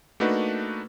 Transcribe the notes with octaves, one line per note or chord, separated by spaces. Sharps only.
A3 A#3 D4 D#4 F#4 B4